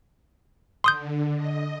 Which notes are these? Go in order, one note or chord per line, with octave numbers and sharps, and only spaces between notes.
D3 C6 D#6 G6
D#5